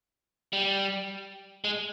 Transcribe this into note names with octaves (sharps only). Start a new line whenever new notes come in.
G3
G#3